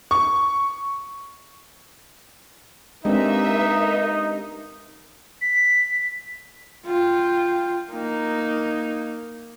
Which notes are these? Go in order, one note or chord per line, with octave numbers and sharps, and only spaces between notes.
C#6
G#3 A#3 C4 D4 D#4 G4 B4 E5
B6
F4 G5
A#3 D#4